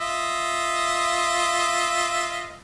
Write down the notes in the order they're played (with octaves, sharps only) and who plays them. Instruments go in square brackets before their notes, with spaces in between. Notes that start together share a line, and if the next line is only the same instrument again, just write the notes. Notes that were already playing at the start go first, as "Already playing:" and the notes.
[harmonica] F4 D#5 E5